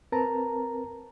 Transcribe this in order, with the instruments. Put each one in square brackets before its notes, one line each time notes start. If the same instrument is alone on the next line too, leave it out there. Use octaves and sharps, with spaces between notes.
[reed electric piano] C4 A#4 B4 A5 A#5